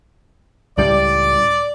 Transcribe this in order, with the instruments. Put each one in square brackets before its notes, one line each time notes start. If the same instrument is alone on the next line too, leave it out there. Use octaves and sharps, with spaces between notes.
[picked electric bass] C#2 A2 G3 [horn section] D5